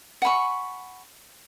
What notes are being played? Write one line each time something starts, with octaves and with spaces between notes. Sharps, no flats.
F#5 G#5 B5 C#6